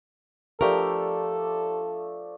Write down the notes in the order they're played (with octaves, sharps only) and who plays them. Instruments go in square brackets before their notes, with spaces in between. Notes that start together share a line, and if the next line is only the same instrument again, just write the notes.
[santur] F3 A3 D4 [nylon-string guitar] G4 A#4 [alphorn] A4